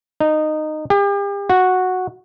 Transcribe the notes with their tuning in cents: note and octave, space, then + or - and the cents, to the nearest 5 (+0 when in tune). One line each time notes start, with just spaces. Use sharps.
D#4 -15
G4 +40
F#4 -5